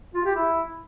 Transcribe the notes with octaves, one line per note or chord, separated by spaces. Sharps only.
F4
G4
E4